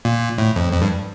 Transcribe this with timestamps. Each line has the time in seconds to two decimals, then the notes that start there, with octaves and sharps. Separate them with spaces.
0.05 A#2
0.38 A2
0.56 F2
0.73 F2
0.82 G2